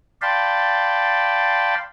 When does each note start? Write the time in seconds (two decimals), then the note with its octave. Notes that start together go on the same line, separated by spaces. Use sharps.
0.22 D5 F5 G5 A5 B5 C6